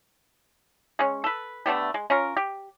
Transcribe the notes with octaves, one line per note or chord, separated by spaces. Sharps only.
G#3 C#4
A4 B4
D3 A3 B3 G4
G#3
C#4 F4 A#4
G4